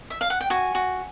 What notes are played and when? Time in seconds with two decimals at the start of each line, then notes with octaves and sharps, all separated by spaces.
0.10 E5
0.21 F5
0.30 F#5
0.41 G5
0.50 F#4 G#5
0.75 F#4